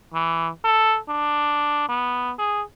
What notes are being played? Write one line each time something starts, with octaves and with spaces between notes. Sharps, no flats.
E3
A4
D4
B3
G#4